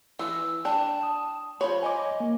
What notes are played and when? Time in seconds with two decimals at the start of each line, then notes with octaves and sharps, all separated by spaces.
0.19 E3 E6
0.65 D4 G5 A5
1.03 D#6
1.61 F3 C#5 B5
1.83 D#5 G#5 D6
2.20 A#3